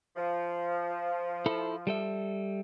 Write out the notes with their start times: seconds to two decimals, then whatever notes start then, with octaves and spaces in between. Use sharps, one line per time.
0.16 F3
1.46 E4 A4
1.87 G3 A4 E5